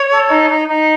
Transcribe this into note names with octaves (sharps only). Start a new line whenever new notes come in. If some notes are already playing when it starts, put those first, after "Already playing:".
Already playing: C#5
A4
D#4
D#4
D#4